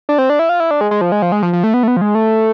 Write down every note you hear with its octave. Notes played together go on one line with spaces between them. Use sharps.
D4
C4
D4
E4
F4
E4
D4
G#3
G#3
F3
G#3
F3
G#3
F3
F3
A3
B3
A3
B3
F3
G#3
A3